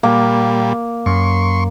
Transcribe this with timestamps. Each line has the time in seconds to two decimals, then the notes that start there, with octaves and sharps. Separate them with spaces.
0.03 A#2 G3 A#3
1.06 F#2 C6 C#6